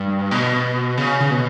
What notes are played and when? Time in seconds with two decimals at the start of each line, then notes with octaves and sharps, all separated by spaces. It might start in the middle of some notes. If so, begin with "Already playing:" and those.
Already playing: G2
0.31 B2
0.97 C#3
1.20 C#3
1.31 B2